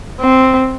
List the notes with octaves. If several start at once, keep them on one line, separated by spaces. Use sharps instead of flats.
C4